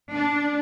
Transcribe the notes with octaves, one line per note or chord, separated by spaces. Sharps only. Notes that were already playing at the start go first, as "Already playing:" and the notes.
D4